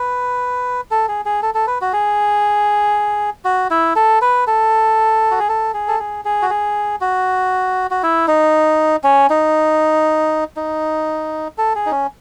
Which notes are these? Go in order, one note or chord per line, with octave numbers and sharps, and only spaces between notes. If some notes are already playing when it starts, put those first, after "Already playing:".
Already playing: B4
A4
G#4
G#4
A4
A4
B4
F#4
G#4
F#4
E4
A4
B4
A4
F#4
G#4
A4
G#4
A4
G#4
G#4
F#4
G#4
F#4
F#4
E4
D#4
C#4
D#4
D#4
A4
G#4
D#4
C#4